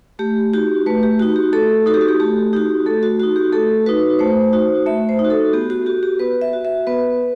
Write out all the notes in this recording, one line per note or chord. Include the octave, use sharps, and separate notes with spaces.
A3 G4
D#4 F#4 G4
A3 B4
G4
D#4 F#4
G4
A3 A4
D#4 F#4 A4
G4
F#4
G4
A3 G4
D#4 F#4 G4
A3 A4
F#4
D#4 F#4
G4
A3 A4
D#4 F#4 B4
A3 C5
D#4 F#4
A3 E5
C5
D#4
F#4
A4
B3 G4
F#4
F#4 G4
G4
B3 B4
E5
F#4
E5
B3 B4